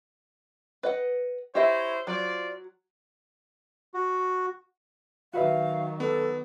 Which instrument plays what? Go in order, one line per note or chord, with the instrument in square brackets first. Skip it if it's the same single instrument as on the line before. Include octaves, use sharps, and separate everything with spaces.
[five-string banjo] B4 D#5 F#5
[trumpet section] E4 C5 C#5 [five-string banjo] G4 D#5 E5
[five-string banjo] F#3 [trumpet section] F4 C5 D5
[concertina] F#4
[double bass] D#3 F#3 [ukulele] F#4 B4 E5 [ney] F5
[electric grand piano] B3 [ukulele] D4 [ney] A4